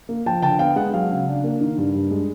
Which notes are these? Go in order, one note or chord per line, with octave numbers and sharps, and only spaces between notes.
A#3
F3 G5 A5
D3 G5 A5
B3 F5 G5
G#3 F#5
F#3 F5
C#3
D4
A#3
D#3
G2
G2
G#3